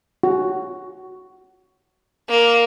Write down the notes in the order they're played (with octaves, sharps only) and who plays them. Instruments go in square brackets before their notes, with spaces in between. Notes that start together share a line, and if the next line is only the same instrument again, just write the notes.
[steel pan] F#4
[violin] A#3